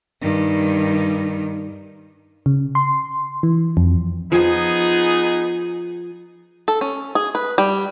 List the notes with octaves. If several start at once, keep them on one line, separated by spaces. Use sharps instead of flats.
G2 D#3
C#3
C6
E3
F2
F3 B3 D#4 G#4 G#5
A4
C#4
G#4
B4
G3